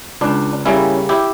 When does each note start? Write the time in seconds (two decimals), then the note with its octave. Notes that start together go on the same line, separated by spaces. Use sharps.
0.21 C#2 D4
0.65 C#3 G3 A#3 C#4 E4
1.09 E4 G4